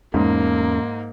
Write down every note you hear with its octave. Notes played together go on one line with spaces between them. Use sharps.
E2 G#2 A#3 C#4